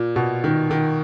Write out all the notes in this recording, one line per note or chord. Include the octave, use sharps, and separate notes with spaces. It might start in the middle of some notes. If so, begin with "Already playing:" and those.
Already playing: A#2
B2
D#3
D#3